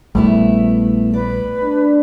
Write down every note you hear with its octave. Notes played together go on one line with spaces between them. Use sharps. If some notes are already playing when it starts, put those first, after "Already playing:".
A#1 G3 A3 B3 E4
B4 D5
D4